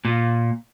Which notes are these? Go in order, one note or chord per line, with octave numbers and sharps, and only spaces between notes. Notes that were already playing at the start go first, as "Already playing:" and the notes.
A#2